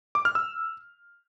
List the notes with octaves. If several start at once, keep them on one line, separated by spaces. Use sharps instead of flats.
D6
F6
E6